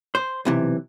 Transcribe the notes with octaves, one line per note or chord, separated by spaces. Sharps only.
C5
B1 C3 E3